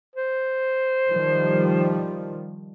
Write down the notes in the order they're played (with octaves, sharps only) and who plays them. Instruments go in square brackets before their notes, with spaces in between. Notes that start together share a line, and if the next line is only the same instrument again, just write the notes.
[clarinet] C5
[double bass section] D#3 F3 G3